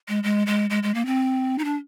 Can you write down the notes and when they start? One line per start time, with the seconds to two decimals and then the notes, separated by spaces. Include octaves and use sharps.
0.09 G#3
0.24 G#3
0.47 G#3
0.70 G#3
0.83 G#3
0.95 A#3
1.06 C4
1.58 D#4
1.64 D4